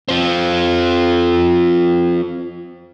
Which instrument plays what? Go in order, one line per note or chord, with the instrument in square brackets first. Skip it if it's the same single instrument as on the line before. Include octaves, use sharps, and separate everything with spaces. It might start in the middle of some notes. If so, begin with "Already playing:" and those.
[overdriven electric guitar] F3 C4